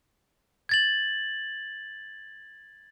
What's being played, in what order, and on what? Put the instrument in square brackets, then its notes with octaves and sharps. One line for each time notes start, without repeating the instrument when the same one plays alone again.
[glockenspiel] G#6 A6 F#7